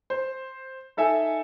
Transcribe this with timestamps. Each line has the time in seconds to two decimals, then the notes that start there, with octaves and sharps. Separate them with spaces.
0.10 C5
0.97 D#4 A4 E5 G#5